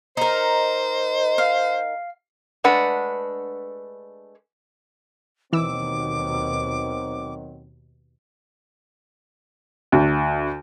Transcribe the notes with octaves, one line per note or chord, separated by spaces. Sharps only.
D#4 A#4 C5
F5
G#3 A3 D4 B4 F#5
D#2 B2 D#3 E3 F#3 C4 D6 E6
D2